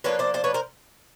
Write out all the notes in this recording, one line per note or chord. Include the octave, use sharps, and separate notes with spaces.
F3 A#3 D4 F4 B4 C#5
C5 D5
C5 D5
B4 C#5
A#4 C5